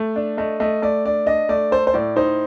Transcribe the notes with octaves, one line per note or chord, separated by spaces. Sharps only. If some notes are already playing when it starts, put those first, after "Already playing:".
Already playing: A3
D4
A3 D#5
A3 D#5
A3 D5
D4 D5
D4 D#5
A3 D5
A4 C5
C5
A2 D5
D#4 C5